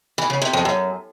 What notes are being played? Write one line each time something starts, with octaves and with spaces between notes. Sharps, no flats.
E3
C#3
C3
F2
F#2